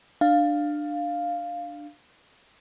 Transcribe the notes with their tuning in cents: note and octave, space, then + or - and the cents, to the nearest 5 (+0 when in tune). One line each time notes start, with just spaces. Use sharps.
D4 +15 F5 +0